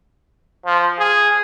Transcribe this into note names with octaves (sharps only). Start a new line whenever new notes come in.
F3
G#4